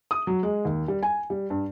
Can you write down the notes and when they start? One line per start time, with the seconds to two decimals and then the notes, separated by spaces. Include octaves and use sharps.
0.11 D#6
0.27 F#3
0.43 G#3
0.65 D#2
0.88 G3
1.03 G#5
1.30 G3
1.50 G2